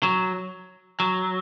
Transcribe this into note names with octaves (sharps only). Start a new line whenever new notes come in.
F#3
F#3